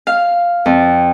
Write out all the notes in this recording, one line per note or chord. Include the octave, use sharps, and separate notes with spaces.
F5
F2